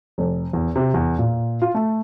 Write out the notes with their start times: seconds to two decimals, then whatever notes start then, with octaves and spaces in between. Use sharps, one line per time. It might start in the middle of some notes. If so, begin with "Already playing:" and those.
0.18 F1
0.53 E2
0.76 C3
0.94 E2
1.19 A#2
1.62 F4
1.74 A3